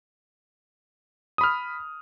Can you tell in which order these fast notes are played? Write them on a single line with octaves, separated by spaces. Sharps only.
D#6 B5 F6